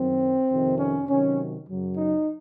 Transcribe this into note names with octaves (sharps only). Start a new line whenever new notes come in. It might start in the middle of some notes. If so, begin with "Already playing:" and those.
Already playing: F#2 D#3 F#3 C4
F2 C3 D#3
C#4
C3 D#3 F#3 C#4
F#2 C#3 F#3
D#4